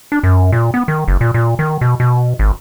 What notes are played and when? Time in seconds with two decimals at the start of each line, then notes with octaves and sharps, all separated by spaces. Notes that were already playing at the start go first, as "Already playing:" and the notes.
0.12 D4
0.23 F#2
0.52 A#2
0.74 B3
0.88 D#3
1.08 F#1
1.21 A#2
1.34 A#2
1.59 D#3
1.81 B2
2.00 B2
2.39 G#1